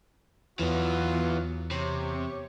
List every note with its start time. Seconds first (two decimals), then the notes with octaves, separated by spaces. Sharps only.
0.59 E2 E3 F#3 B3 F4
1.71 C3 G4 C#5